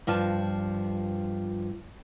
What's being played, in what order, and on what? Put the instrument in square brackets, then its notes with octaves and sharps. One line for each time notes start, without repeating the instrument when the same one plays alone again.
[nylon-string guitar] G2 F3 F4 A5